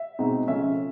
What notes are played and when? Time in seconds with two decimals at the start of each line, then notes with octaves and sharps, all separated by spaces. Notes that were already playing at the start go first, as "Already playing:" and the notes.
Already playing: E5
0.19 B2 G#3 C4 D#4
0.48 C#3 F3 A3 C#4 E5